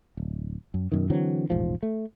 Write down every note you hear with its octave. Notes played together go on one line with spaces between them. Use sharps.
D1
F#2
F#2 B2 D#3
D3 E3 F#3 C4
E1 A1 G#2 F3
A3